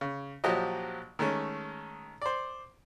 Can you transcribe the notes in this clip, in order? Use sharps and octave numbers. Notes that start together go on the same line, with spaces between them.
C#3
A#1 F3 F#3 F#4 G4 D#5
D#3 G#3 A3 C#4
C5 D5